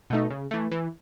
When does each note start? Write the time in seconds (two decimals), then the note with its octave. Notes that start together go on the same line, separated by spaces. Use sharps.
0.10 B2 A3 D#4
0.30 C#3
0.51 E3 A3
0.72 E3